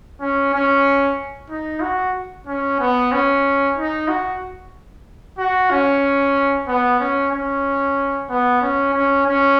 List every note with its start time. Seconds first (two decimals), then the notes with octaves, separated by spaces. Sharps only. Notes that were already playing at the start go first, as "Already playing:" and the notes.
0.21 C#4
0.53 C#4
1.50 D#4
1.82 F#4
2.47 C#4
2.80 B3
3.12 C#4
3.77 D#4
4.08 F#4
5.38 F#4
5.71 C#4
6.68 B3
7.00 C#4
7.33 C#4
8.30 B3
8.62 C#4
8.94 C#4
9.27 C#4